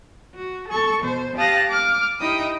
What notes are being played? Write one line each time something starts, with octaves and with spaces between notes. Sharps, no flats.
F#4
A4 C#6
B2 C5
G4 F5 A5 D#6 F#6 A#6
D6 F6
D#4 E4 G4 D#5 G5 D#6